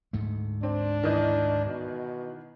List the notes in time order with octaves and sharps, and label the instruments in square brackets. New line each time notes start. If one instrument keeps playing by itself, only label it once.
[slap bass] D2 G#2 A3
[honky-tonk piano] C4 [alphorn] D4
[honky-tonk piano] D#3 E3 D#5
[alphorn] B2